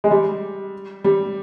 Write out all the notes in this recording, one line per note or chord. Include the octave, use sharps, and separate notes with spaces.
G#3
G3
G3